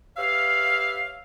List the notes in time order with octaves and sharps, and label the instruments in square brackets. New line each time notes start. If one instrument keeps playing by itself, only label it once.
[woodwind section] G4 B4 C#5 E5 F5